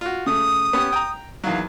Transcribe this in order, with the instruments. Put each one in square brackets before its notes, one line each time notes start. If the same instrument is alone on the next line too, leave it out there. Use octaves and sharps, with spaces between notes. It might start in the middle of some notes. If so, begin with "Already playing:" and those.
[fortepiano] F4 F#4
[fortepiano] C#3 A3 [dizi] D#6
[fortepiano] B3 C#4 G4
G5 A#5
[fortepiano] E2 D#3 F#3 [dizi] F5